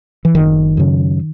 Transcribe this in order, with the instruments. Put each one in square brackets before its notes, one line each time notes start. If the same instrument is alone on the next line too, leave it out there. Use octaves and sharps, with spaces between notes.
[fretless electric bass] E3
F#1 D#3
F#2 C#3